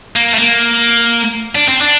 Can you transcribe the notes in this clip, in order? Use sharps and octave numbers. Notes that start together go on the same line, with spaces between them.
A#3
A3
A#3
D4
C4
D4